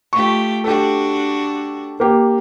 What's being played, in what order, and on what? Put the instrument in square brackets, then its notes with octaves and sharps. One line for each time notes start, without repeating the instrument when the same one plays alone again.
[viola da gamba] A3 F4 G4 [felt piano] C#6
[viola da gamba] D4 F#4 [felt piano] G4 A4
[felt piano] A#3 G4